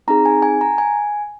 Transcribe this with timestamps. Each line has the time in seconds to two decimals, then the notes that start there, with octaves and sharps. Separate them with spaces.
0.08 C4 D#4 G#4 A#5
0.26 G#5
0.43 G#5
0.61 A#5
0.78 G#5